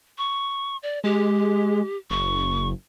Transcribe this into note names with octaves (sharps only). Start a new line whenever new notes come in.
C#6
D5
G#3 G4
F#1 C#6